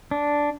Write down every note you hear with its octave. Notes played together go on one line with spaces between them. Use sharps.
D4